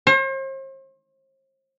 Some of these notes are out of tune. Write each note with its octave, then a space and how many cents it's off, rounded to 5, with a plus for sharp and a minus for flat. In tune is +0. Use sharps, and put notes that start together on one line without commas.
C5 +40